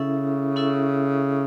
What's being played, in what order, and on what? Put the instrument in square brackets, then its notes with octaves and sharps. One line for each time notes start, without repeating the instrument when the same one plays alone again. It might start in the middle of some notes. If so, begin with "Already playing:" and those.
Already playing: [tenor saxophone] C#3 [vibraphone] C#4 E4 A4 E5
[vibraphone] C#4 E4 A4 E5